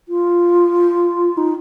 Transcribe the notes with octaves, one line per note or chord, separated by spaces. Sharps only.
F4
D#4